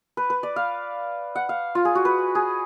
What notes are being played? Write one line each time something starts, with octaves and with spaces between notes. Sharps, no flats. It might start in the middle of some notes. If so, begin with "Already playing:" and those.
B4
B4
D5
F5
F#5
F5
F4
G#4
F#4
B4
G#4